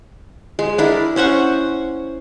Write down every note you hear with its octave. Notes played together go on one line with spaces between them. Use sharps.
G#3
D4 E4 A#4
C#4 C5 F#5 C#6